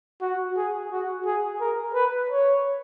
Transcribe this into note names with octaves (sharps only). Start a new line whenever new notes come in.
F#4
G#4
F#4
G#4
A#4
B4
C#5